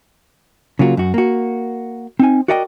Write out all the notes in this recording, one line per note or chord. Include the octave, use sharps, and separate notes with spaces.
C#3 F#3 A#3 F4 F#4
F#2 F#4
A#3 F#4
C4 D#4 G#5
F#4 A#4 D5 D#5 F#5 G5